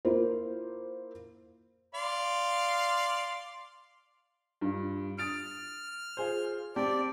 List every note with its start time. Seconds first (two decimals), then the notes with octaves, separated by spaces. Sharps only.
0.05 A#3 E4 F4 C5
1.95 D5 F5 C6
4.61 G2 F4
5.18 D#6 F6 A6 D7
6.17 F4 G#4 C5
6.76 C4 G4 D5 A5